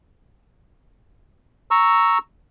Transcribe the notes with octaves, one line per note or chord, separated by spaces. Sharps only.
A#5 C#6 E6